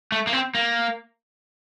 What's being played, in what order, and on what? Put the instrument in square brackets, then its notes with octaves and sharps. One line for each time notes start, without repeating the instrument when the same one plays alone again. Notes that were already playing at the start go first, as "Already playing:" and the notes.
[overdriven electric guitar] A3
A#3
C4
A#3